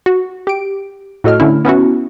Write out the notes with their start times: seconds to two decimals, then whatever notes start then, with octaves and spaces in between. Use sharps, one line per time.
0.06 F#4
0.47 G4 D7
1.24 A2 F#4 A4 D#5 F6
1.40 D3 A3 C#4 E4
1.65 B3 C#4 E4 F#4